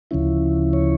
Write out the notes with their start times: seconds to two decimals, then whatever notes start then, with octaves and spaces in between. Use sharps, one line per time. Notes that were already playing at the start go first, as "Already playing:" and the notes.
0.11 D2 C#3 F3 C#4 E4
0.73 C#5